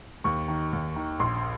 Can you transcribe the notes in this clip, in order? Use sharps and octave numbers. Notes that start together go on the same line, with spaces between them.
D#2 C#6
D#3
D#2
D#3
A#1 C6